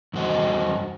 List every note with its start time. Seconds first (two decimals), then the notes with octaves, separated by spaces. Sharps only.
0.14 E2 G2 F#4 C5 D#5